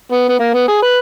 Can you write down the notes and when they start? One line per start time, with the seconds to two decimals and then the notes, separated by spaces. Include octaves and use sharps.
0.12 B3
0.29 B3
0.39 A#3
0.54 B3
0.68 G#4
0.83 B4